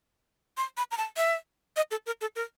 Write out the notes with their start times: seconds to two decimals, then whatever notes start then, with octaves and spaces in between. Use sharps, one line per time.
0.57 C6
0.77 B5
0.91 A#5
0.98 A5
1.17 E5
1.76 D#5
1.91 A4
2.06 A#4
2.21 A4
2.36 A#4